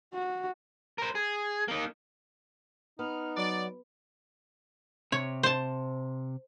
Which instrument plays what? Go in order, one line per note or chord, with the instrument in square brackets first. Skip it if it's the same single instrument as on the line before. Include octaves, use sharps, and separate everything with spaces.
[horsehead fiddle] F#4
[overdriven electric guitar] A#4 C5
G#4
A#3 D#4
[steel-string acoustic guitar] B3 [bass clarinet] D#4 [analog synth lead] F6
[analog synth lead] F#3 [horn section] D5
[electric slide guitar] C3 [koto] C#5
[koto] C5 A5